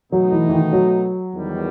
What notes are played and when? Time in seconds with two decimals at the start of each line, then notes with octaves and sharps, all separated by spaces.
0.12 B2 F#3 A3 D#4
0.32 E3
0.49 E3
0.52 D#3
0.73 F#3
1.34 E2 D#3 G3